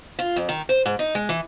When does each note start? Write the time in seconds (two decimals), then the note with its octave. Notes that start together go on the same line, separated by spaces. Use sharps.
0.19 F4
0.36 F2
0.49 D#3
0.69 C5
0.86 G#2
0.99 D#4
1.15 G#3
1.29 E3